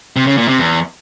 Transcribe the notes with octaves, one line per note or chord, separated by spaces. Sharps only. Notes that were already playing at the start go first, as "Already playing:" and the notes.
C3
C#3
A#2
C3
E2